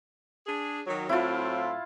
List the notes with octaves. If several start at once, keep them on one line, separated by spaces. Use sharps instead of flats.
D4 G#4
D#3 F#3
A2 F#3 C4 E4 F4